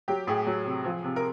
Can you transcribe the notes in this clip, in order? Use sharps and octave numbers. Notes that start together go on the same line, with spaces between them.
F#3 G4
A2 G#4
F#3
C3
F3
C3
A#4